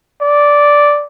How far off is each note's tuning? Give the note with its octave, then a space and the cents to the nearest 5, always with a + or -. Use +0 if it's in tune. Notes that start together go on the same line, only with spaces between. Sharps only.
D5 -5